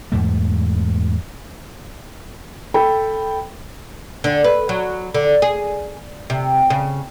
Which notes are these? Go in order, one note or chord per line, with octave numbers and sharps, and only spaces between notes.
E2 G#2 A3
A4 G5 B5
D3
B4
F#3
D3
G#4
C3
C#3